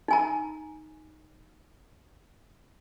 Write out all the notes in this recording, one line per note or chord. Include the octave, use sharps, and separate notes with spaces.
D#4 G#5 A#5